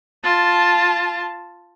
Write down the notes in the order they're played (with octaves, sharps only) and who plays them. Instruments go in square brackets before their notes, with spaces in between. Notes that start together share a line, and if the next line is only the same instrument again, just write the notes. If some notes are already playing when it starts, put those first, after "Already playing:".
[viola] F4 A5